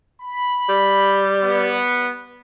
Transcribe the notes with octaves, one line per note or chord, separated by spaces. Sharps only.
B5
G3
B3